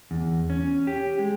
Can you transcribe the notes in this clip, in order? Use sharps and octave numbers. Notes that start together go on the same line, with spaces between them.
E2
C#4
G4
G#3